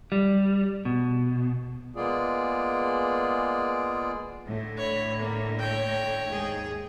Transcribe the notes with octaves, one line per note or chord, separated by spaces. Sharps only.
G3
B2
G#3 A#3 B3 F4 G#4 D5
A2 D3
C#5 B5
A#3
C#5 G5
D#2 G#2 G#4